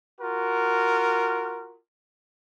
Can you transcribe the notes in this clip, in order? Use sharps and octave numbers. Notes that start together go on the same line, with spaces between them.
F4 F#4 A#4